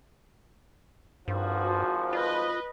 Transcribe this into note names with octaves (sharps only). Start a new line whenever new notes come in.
G#1 G2 F3 F#4
F4 B4 D#5